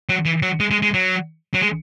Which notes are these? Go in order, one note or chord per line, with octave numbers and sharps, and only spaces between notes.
F#3
E3
F#3
G#3
G#3
G#3
F#3
F#3
G#3